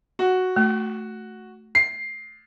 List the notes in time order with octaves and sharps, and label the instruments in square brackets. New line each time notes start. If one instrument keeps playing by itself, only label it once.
[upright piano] F#4
[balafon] A3
[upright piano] C7